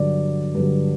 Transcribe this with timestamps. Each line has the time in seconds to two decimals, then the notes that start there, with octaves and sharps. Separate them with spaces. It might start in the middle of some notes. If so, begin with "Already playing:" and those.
Already playing: G2 D3 F#3 D5
0.55 G2 D3 F#3